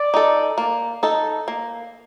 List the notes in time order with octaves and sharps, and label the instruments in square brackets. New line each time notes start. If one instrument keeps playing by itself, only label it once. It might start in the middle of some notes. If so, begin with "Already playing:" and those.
Already playing: [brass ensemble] D5
[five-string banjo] D#4 A4
A#3
D#4 A4
A#3